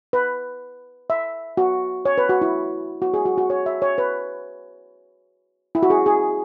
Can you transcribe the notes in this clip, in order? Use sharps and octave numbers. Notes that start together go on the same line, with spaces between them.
B4
E5
F#4
C#5
B4
F#4
E4
F#4
G#4
F#4
F#4
C#5
E5
C#5
B4
E4
F#4
G#4
G#4